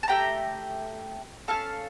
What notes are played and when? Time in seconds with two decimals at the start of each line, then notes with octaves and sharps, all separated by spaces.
0.03 A5
0.08 A3 D4 G4 G5 A#5
1.48 E4 A4 F5 A5
1.53 C#4